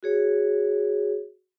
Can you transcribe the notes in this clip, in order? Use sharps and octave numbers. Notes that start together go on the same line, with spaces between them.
F#4 G#4 C#5